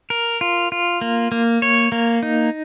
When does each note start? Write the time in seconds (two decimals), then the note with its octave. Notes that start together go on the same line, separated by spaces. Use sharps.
0.10 A#4
0.41 F4
0.72 F4
1.01 A#3
1.32 A#3
1.62 C#5
1.92 A#3
2.23 D#4